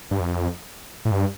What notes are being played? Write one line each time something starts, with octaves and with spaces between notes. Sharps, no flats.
G2
F2
A2
G2